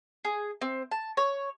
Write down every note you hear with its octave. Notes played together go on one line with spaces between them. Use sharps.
G#4
C4
A5
C#5